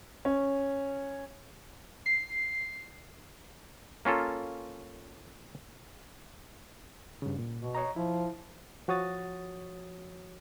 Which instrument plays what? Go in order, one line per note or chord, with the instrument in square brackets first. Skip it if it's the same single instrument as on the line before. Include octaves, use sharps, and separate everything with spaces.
[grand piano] C#4
[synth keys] C7
[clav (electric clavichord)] A#3 C#4 F4 A4
[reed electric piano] G2 C#3
A#2
[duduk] B2
[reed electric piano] C#5 D#5 A#5
[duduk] F3 [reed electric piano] E4
[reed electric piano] F3 F#4 C#5 D#6 A6